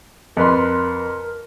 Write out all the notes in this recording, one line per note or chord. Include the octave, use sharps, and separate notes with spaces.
F2 A#4 B4 C6